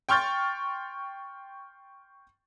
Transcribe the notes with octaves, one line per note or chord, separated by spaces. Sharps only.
G5 C6 C#6 F6 G6 A6